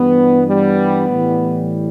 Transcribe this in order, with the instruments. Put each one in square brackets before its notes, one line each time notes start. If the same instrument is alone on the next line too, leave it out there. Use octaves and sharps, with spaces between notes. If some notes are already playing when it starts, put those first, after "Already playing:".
Already playing: [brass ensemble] G2 E3 G3 B3
G3 B3
A2 E3 G3